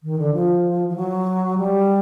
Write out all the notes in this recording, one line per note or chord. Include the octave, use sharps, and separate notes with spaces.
D#3
D3
F3
F3
F#3
G3